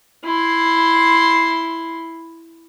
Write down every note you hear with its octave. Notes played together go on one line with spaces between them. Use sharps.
E4 C6